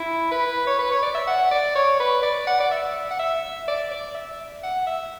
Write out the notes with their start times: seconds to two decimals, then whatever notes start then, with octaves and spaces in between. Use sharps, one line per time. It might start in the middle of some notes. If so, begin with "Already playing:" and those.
Already playing: E4
0.31 B4
0.67 C#5
0.79 B4
0.92 C#5
1.02 D5
1.14 E5
1.27 F#5
1.51 D5
1.75 C#5
2.00 B4
2.23 D5
2.47 F#5
2.60 D5
2.71 E5
3.10 F#5
3.19 E5
3.68 D5
3.91 D5
4.15 E5
4.63 F#5
4.87 E5